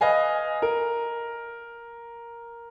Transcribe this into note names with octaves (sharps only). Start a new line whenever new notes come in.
B4 D#5 F5 G#5
A#4